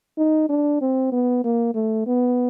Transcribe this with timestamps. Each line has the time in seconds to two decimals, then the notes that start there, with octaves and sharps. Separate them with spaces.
0.18 D#4
0.49 D4
0.81 C4
1.12 B3
1.44 A#3
1.75 A3
2.07 B3